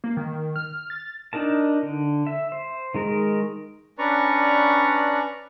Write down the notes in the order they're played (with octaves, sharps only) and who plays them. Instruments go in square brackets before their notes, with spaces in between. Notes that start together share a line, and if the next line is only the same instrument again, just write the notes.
[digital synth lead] A#3
D#3
F6
A6
[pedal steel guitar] D4 D#4 A#4 A5
D3
E5
C5
D#3 G#3 A#4
[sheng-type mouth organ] C#4 D4 B4 D5 A#5 C#6